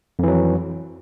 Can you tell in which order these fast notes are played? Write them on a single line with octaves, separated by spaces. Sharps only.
F2 E3 F#3